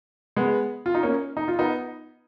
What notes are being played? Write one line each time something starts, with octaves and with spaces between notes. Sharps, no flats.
G#3 B3
F4
D#4
A#3 C#4
D#4
F4
B3 D#4